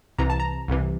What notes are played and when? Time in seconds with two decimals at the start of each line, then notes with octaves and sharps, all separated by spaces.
0.18 C2 C3 E3 A#5
0.30 A5
0.40 A#5
0.68 C2 C3 E3